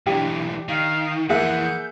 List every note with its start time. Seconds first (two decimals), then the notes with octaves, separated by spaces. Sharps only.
0.06 B1 E3 D4 G4
0.68 D#3 F5
1.29 F2 E3 A#3 G#4 E5 F#5 G6